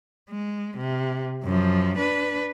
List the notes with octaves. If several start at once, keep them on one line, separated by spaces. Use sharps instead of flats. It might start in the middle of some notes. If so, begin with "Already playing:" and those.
G#3
C3
F#2 F3
D4 B4